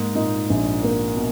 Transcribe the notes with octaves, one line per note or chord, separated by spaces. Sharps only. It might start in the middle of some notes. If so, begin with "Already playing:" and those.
Already playing: G#2 A#3
A#2 D#4
A#1
A#3
B2